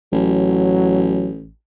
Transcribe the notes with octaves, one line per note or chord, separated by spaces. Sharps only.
A1 F#3